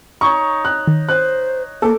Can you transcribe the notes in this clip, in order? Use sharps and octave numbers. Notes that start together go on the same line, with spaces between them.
D#4 C#5 C#6
F#6
D#3
C5 F#6
A#3 A4 D6